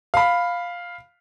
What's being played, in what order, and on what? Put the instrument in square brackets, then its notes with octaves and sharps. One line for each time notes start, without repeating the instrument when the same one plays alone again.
[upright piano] F5 B5